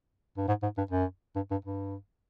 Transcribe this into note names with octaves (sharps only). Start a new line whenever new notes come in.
G2
G#2
G#2
G2
F#2
G2
G2
G2